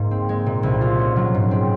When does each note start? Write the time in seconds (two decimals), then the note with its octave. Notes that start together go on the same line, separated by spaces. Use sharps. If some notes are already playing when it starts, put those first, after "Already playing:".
Already playing: G#2 A#3
0.11 C4
0.29 G#3
0.46 A#2
0.63 C2
0.81 F4
0.99 C#4
1.16 F#3
1.34 G#2
1.51 C4